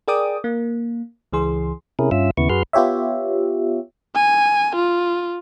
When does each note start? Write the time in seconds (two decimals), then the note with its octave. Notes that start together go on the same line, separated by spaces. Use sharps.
0.08 G#4 A#4 D5 G5 D6 D#6
0.44 A#3
1.33 C#2 E3 G#4 C6
1.99 C3 C#4 E4 G#4 A#4
2.11 G2 C#4 F4 E5 E6
2.37 D#2 C#3 B3 E4 C#6
2.49 F#2 F#4 G#4 B4 C6 F6
2.73 B3 F4 G4 C#5 E5
4.16 G#5
4.76 F4